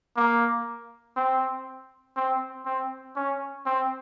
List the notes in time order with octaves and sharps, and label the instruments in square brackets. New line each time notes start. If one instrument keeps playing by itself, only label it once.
[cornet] A#3
C4
C4
C4
C#4
C4